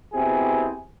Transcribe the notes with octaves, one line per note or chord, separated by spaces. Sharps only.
B2 C4 E4 G4 G#4